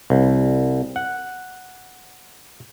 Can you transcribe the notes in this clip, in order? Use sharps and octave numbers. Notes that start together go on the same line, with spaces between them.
C2
F#5